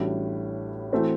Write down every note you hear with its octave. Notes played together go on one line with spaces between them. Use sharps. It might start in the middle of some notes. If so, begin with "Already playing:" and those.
Already playing: A1 A2 G3 D4 F#4
E3 A3 C4 F#4